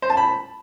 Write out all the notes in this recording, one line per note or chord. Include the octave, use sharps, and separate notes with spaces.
C5
A5
B5